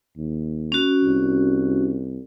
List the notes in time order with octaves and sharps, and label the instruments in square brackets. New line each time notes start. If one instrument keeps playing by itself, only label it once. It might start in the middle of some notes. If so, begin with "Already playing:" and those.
[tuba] D#2
[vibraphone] C#4 F#4
[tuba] C2